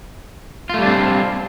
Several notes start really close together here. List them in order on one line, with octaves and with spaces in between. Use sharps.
F4 A3 G3 D4 C4